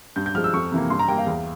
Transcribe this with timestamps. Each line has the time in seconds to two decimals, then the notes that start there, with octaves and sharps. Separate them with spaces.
0.16 G2 G6
0.26 G6
0.35 F3 G#3 F6
0.44 E6
0.53 F2 C#6
0.72 C3 E3 A#3
0.90 G2 C6
0.99 A#5
1.08 G3 A#3 G5
1.18 F5
1.27 E2